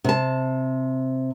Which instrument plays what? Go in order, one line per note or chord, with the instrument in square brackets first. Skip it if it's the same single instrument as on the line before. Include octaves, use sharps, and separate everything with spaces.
[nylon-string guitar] C3 A5